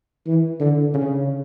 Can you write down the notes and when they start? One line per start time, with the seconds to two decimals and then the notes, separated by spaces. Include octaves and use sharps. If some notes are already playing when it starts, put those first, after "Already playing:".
0.27 E3
0.60 D3
0.94 C#3